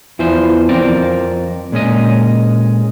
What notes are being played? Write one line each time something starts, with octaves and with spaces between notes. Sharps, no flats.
E2 E3 F3 C5
F2 C4 A#4 D5
A#2 G#3 C#4 D#5